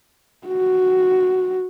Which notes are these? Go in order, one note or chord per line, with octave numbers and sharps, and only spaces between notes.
F#4